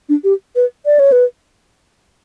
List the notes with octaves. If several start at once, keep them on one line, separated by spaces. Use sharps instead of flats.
D4
G4
B4
D5
C#5
B4